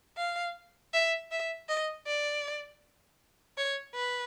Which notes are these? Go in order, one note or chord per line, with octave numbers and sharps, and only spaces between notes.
F5
E5
E5
D#5
D5
C#5
B4